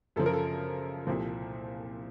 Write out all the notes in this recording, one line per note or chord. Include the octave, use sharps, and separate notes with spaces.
F#2 C#3 F3 A4
A#4
A4
C2 A#2 F3